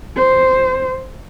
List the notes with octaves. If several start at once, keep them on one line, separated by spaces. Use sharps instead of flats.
C5